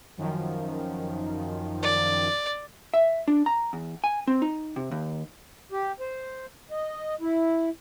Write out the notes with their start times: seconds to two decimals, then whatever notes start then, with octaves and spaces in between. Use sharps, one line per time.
0.17 F#2 D#3 F3
1.83 D5
2.94 E5
3.28 D4
3.46 A#5
3.73 E2
4.04 G#5
4.27 C4
4.42 D#4
4.76 C3
4.91 D#2
5.72 G4
6.00 C5
6.71 D#5
7.20 E4